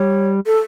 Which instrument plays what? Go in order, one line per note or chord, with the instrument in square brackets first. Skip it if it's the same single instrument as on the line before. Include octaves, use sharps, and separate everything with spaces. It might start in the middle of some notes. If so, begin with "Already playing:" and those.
Already playing: [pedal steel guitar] G3 [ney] C#5
[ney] A4